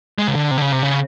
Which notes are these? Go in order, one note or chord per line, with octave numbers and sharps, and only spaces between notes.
G#3
C#3
D3
C3
D3
C#3
C3
C#3